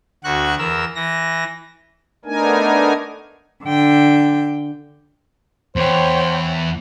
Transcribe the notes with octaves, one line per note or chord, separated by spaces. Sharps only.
D2 F#4 C#6 F#6
E2 A#4 E6
E3 A#6
A3 B3 D4 D#4 A#4 G#5
D3 G5
E2 C5 C#5 G5